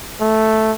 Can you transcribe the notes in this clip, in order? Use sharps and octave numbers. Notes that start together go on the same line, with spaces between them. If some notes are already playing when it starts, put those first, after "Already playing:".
A3